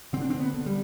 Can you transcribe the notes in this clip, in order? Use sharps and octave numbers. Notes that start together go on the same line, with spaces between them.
D3 C4
D4
C4
B3
D3
G3